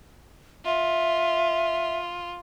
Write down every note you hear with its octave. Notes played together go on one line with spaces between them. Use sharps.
F4 E5